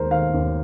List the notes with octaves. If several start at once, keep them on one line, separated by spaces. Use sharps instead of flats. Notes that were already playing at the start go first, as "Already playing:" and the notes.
Already playing: D#2 G#3 A#4 C5
D#3 F5
D#2